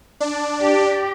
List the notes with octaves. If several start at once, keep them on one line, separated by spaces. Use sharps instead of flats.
D4 D5
G4